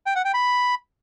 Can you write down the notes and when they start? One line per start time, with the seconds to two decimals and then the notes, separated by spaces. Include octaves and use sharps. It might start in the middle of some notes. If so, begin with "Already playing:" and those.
0.06 G5
0.16 F#5
0.25 G5
0.34 B5